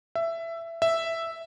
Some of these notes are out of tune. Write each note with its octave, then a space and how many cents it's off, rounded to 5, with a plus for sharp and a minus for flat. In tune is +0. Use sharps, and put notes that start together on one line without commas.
E5 +15
E5 +0